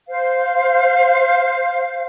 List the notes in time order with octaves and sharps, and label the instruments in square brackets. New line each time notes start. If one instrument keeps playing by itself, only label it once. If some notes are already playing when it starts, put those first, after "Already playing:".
[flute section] C5 F5